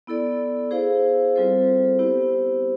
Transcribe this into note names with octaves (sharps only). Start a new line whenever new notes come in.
B3 E4 A4 D5
E4 G#4 C5 F5
G3 C4 F4 A4 C5
B3 E4 G4 C5